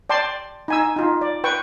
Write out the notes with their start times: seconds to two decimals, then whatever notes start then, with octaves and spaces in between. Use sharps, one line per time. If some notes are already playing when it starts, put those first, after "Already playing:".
0.09 D5 G5 A5 C6
0.68 D#4 G#5 E6
0.96 D#4 F4
1.21 D5
1.44 B4 G5 C#6